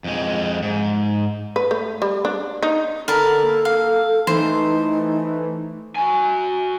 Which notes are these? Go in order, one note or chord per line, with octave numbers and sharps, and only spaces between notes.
F2 G#3
G#2
B4
A3
G3
D4
D#4
D3 A4 A#4 A5 B5
A#3
F5
E3 A3 D#4 C5
F#4 G#5